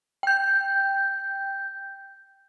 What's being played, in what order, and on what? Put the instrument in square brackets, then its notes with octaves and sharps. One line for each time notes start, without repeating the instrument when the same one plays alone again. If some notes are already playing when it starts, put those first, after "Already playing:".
[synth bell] G5 G6